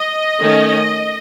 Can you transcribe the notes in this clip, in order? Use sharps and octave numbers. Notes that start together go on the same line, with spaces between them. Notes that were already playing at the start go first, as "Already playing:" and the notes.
Already playing: D#5
D#3 A3 C#4